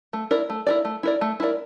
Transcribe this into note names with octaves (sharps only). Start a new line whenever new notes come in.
A3
E4 A#4 D5
A3
E4 A#4 D5
A3
E4 A#4 D5
A3
E4 A#4 D5